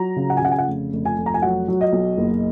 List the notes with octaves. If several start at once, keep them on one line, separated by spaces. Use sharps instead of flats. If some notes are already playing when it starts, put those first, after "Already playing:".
Already playing: F#3 A#5
C#3
F#5
G#5
C#3 F#5
G#5
F#5
F1
F1
G#5
F1
A#5
G#5
F#3 F#5
F#3
D#5
B1
F#1